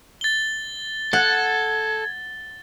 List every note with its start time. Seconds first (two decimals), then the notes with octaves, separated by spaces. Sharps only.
0.21 A6 G7
1.13 A4 F#5 G#6